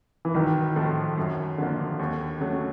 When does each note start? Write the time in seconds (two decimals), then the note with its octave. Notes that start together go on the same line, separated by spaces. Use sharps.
0.25 E3
0.34 B1 D#3
0.76 A2 F3 A3
1.17 F#2
1.58 D3 F3 A#3
1.99 D#2
2.40 C#3 F#3 A3